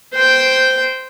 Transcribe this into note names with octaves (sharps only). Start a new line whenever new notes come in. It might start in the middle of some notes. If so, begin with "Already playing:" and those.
C5 G5